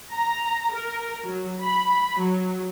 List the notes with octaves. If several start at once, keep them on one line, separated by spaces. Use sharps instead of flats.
A#5
A#4
F#3
B5
F#3